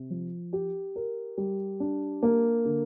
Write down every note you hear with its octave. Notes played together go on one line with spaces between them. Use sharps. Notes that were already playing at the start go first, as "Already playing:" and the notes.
Already playing: C3
F3
G4
A#4
G3
D4
A#3
D3